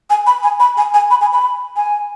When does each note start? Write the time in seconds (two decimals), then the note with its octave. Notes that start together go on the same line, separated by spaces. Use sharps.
0.10 G#5
0.27 B5
0.43 G#5
0.60 B5
0.77 G#5
0.94 G#5
1.11 B5
1.21 G#5
1.33 B5
1.76 G#5